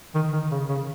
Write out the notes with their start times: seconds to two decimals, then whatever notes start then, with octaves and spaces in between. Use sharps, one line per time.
0.15 D#3
0.33 D#3
0.51 C#3
0.69 C#3